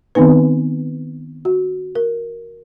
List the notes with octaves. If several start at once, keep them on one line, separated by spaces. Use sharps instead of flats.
D#3 B3 C4 D#4 B4
F#4
A#4